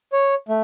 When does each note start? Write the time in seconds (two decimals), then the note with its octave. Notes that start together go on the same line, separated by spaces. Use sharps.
0.12 C#5
0.49 A3